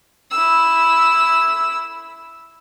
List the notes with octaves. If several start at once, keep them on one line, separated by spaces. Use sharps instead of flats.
E4 E6